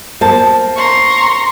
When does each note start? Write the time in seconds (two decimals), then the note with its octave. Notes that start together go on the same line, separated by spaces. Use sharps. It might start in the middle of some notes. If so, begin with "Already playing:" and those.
0.21 A#3 C5 A5
0.75 A#5 C6 C#6